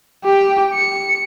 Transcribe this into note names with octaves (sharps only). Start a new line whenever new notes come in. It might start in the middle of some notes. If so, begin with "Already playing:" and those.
G4 G5
C#7